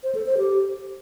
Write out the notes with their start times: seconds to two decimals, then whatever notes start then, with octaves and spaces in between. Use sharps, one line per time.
0.03 C5
0.15 A4
0.26 C5
0.38 G4